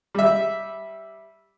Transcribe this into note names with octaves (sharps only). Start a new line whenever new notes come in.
G3 E5